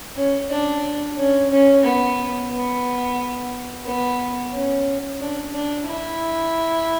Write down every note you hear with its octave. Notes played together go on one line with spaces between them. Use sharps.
C#4
D4
C#4
C#4
B3
B3
B3
C#4
D4
D4
E4